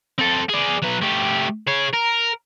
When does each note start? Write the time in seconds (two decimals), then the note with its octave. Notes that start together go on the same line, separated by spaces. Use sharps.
0.19 C4 A4
0.49 G#4 D5
0.83 F#3 B4
1.02 A3 G4
1.67 G#4 C#5
1.93 A#4